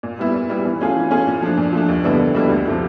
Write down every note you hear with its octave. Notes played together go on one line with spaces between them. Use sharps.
A#2
G3 B3 E4
A#2
G3 B3 E4
E3
A3 C#4 F4 G#4
E3
A3 C#4 F4 G#4
A#2
F3 A3 D4
A#2
F3 A3 D4
D#2
D3 G3 B3 E4
D#2
D3 G3 B3 E4
D2
C3 F3 A3